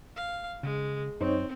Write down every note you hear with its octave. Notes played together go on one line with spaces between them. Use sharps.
F5
C#3 G#3
F#2 C4 D#4 C5 C#5